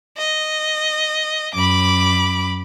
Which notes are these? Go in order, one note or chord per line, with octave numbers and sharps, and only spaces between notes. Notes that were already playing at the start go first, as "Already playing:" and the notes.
D#5
F#2 B5 D6